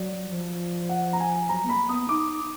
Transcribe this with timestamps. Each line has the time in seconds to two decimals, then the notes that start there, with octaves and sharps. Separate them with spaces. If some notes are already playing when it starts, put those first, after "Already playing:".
Already playing: F#3 D5
0.30 F3
0.89 F#5
1.13 A#5
1.20 G#5
1.49 F#3 A#5
1.65 B3
1.69 A#3 B5
1.89 B3 D#6
2.09 D#4 D6